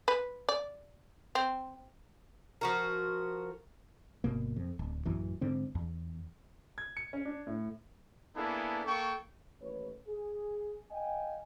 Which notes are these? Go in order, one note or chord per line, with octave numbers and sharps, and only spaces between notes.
B4
D5
C4
F3 F#4 A#4
G1 B2 A#3
F2
D1
A1 F#2 E3
G#2 D3 C4
E2
G#6
C#7
C#4
D4
A2
A#3 B3 D4 E4 G#4 A4
A#3 A4 G5 C#6
A1 D#2 B4 C#5
G#4
D#5 F5 G5 G#5